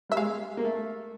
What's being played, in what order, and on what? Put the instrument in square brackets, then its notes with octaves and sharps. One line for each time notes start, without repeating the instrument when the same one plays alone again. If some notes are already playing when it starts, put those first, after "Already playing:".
[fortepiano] G3 [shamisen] E5
[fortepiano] G#3 [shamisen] F5
[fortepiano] A#3
A3